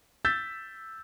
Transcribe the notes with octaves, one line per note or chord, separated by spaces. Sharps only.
E6 G6 A6 B6